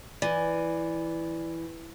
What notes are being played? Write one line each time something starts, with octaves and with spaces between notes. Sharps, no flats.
E3 D5